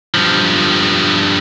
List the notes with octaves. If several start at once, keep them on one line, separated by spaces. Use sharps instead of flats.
G2 F3